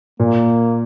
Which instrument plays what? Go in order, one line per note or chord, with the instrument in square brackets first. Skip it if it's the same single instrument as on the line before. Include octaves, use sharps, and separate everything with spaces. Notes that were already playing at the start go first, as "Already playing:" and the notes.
[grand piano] A#2 [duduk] A#3